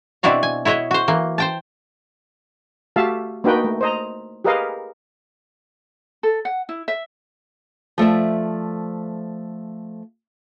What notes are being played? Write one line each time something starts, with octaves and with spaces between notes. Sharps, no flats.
B2 C4 D4 E4 F#4 F5
G#5
E4 F#4 C#5 D#5 E5
F#4 C5
E3 A#3
C5 G5 A5
A3 F#4 G4 E5 F5 A5
A#3 D4 D#4 F#4 B4 G5
A3
C5 D#5 A#5
G4 G#4 A#4 B4 D#5 F5
A4
F#5
E4
E5
F3 A3 D5 E5